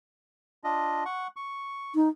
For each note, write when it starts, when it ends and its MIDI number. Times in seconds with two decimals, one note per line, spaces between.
0.64 1.04 62
0.64 1.04 65
0.64 1.04 75
1.05 1.27 78
1.05 1.27 85
1.36 1.93 85
1.95 2.09 63